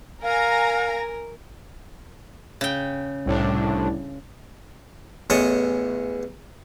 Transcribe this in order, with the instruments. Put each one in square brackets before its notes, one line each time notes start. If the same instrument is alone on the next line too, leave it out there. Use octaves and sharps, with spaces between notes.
[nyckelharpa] A#4 [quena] F5 [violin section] G#5 A#5 A#6
[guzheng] C#3 G5
[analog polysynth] C2 A2 D4
[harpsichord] A1 E2 C#5 D#5 A5 C#6